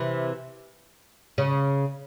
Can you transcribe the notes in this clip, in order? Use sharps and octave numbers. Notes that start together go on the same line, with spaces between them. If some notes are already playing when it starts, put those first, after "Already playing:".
Already playing: C3 E3
C#3